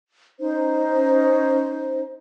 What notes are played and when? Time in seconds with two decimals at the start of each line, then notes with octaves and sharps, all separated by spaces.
0.39 C#4 D#4 C5